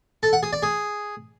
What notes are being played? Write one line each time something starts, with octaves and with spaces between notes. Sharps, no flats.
A4
F#5
G#4
D5
G#4